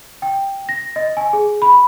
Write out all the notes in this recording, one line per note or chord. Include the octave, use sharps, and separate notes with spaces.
G5
A#6
D#5
G#5
G#4
B5